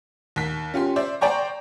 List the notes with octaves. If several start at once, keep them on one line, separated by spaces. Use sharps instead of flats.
D#2 B6
C#4 F4 G4 C6
C5 D5 E5
C5 D5 G5 A#5 C#6